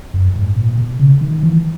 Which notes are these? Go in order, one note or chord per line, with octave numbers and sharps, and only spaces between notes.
F#2
G#2
A#2
B2
C#3
D#3
E3